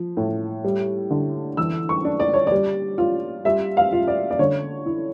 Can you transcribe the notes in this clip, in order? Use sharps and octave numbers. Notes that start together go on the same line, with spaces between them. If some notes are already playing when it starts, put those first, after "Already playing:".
Already playing: F3
A2
G3
D3
E3 E6
C#6
D4
D5
C#5
G3 D5
F4
G3 E5
F5
F4
D5
D5
D3 C#5
E4